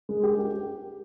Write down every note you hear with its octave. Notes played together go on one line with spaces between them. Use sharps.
G#3
G4
G4